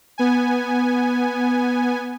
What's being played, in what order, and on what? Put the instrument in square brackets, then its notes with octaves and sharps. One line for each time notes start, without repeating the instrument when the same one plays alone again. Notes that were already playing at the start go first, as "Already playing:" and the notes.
[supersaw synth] B3 G#5